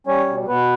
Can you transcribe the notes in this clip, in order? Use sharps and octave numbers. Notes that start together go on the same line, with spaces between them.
G3 C#4 C#5
B2
B2 B3 B4